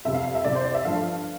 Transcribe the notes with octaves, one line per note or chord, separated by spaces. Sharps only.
F2 C3 G3 E5
F5
F5
E5
C2 C3 G3 D5
C5
D5
E5
G1 G2 F3 A3 F5